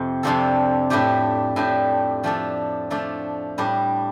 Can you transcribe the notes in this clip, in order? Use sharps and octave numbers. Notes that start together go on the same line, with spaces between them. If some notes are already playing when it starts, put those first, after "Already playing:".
Already playing: F2 C3
F2 C3 F3 D4 A4
A2 A3 D4 G4
A2 A3 D4 G4
F3 A3 D4 A4
F3 A3 D4 A4
A2 G3 D4